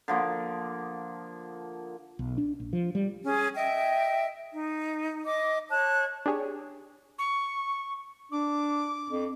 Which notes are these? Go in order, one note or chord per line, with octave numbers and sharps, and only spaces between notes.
D3 F3 A#3
B1
D4
A#1
F3
G3
C#4 G#4
D#5 E5 G5
D#4
D#5 D6
C#5 A5 F#6
D4 G4 G#4 C#5
C#6
D4 D6
F2